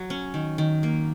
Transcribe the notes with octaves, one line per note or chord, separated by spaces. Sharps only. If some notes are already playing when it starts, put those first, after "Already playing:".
Already playing: F#3
C#4
D#3
D#3
A#3